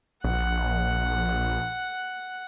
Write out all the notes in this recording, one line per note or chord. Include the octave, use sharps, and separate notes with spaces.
A#1 F#5